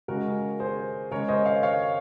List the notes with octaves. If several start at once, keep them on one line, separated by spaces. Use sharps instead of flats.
C#3 G#3 F#4 A#4
G#4 C5
C#3 G#3 A#4 C#5
C5 D#5
C#5 F5
C#5 F5